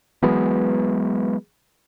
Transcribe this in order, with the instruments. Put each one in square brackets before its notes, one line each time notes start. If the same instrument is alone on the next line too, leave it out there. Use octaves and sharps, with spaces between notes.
[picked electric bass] E3 F#3 G#3 B3